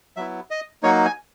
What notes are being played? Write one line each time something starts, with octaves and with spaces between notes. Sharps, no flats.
F#3 B3 E4 E5
D#5
F#3 A#3 D#4 C#5
G#5